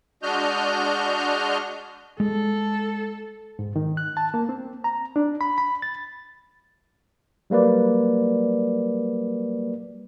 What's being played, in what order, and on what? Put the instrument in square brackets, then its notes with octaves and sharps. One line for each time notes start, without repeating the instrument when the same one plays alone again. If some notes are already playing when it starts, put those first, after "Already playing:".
[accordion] G#3 D4 F#4 D#5 F6 G6
[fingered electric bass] G#3 [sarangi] A4
[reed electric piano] G#2
D#3
F#6
A5
A#3
C4
A#5
D4
B5
B5
A6
[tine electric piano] F#3 G3 A#3 B4 D5